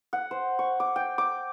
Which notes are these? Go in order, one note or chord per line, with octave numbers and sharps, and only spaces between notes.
F#5
C5
C#6
D6
G5
D6